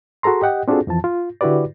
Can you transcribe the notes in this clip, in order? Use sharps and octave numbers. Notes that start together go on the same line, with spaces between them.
F#4 G#4 A4 A#5 C6
G4 D#5 F#5 G5
C4 D4 F4 F#4 G#4 A4
F2 E3 F3 A5
F4
D3 E4 F#4 G4 B4 D5